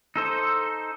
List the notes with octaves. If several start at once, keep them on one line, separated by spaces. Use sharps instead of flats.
D#4 A4 C5